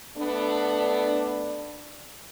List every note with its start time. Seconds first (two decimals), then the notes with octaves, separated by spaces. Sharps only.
0.17 A3 B3 D4